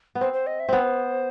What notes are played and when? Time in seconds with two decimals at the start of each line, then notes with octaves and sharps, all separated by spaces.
0.15 B3
0.21 C4 C5
0.33 C5
0.47 D#5
0.60 E5
0.69 B3 C4 C5